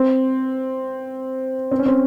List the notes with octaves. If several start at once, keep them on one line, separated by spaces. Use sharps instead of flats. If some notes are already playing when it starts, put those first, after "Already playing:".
Already playing: C4
C4
C#4
C4